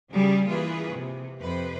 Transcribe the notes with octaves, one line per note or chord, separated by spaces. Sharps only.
C#3 F#3 G3 G#4
E3 A#3 F4 G#4 B4
C3
F2 C3 B4 C5